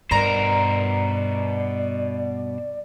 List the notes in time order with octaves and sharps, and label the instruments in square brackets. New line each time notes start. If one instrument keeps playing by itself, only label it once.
[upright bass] G2 [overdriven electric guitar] B2 C5 [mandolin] A#4 A#5 [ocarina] D5